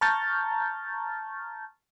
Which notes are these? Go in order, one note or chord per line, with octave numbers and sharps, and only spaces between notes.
A5 A#5 C#6 F6 G6 A6